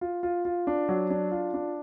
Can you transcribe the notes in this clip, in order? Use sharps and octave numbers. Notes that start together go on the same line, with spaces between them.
F4
F4
F4
D4
F#3
D4
F4
D4